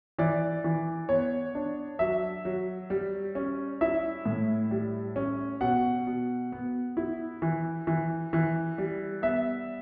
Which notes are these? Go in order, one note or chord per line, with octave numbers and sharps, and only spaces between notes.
E3 D5
E3
B3 C#5
D4
F#3 E5
F#3
G3
C#4
E4 E5
A2
G3
C#4
B2 F#5
B2
B3
E4
E3
E3
E3
G3
B3 E5